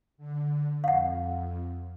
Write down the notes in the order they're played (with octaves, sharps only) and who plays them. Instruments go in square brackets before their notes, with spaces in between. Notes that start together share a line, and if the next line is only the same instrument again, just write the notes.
[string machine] D3
[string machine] F2 [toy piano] F5 F#5